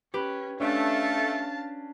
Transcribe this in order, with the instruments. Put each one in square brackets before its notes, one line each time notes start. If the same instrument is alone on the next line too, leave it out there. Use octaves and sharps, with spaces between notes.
[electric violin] C#4 [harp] G4 B4
[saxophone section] A3 [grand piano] C#4 D4 [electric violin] F5 A5